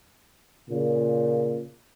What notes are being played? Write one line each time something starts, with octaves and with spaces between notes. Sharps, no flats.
A#2 C#3